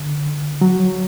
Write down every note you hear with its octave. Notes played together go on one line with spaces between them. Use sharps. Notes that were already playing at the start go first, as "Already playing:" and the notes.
Already playing: D3
F#3